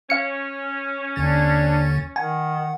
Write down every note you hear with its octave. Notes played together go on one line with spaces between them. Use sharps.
C#4 F5 C#7
D#2 D3 D4 A6
D#3 F#5 G#5